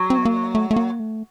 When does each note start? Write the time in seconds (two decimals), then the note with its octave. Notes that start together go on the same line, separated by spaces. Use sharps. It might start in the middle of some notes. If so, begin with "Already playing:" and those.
Already playing: F#3
0.10 C4
0.18 B3
0.25 A#3
0.55 A3
0.71 A3
0.76 A#3
1.00 A3